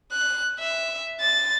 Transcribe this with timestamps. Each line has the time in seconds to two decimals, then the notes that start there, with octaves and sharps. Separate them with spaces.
0.12 F#6
0.59 E5
1.20 A6